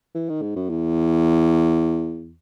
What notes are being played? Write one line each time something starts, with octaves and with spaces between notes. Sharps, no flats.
E3
D#3
G#2
F#2
E2